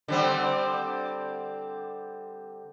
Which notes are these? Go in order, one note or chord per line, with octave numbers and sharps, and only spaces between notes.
D3 G3 C4